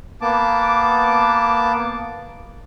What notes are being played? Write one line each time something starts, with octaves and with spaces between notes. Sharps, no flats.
A#3 B3 A5 D6